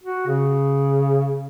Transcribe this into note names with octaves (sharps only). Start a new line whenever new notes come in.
F#4
C#3